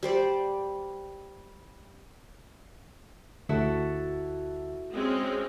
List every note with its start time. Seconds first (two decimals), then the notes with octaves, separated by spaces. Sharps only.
0.03 G3 C5 D5
3.49 D2 E4 F#4 A4
4.93 G#3 C4 C#4